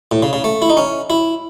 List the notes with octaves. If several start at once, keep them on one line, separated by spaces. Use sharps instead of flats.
A2
C#3
C#3
A3
E4
D#4
C#4
E4